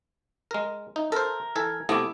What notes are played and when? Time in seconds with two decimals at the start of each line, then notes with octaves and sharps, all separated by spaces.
0.51 G#3 A#4
0.96 D#4 E5
1.12 A4 A#4 C5
1.56 E3 A4 G#5 G#6
1.89 C3 A3 B3 E4 D6 D#6